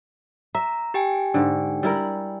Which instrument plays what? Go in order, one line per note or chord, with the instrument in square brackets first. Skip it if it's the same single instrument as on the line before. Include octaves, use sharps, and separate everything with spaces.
[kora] E5 [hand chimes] A#5
[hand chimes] G4 G5 G#5
[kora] G#2 D3
G3 E4 A#4